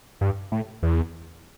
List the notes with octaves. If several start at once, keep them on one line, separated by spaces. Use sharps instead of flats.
G2
A2
E2